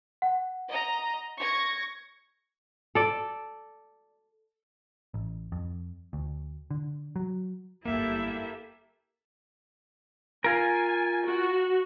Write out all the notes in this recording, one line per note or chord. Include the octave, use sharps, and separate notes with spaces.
F#5
D#5 A#5
C#6 G#6 A#6
A4 D5
A1
F2
D2
D3
F#3
G1 F#2 A#3 E4 G4 A4 E5
F4 A#4 G#5
F#4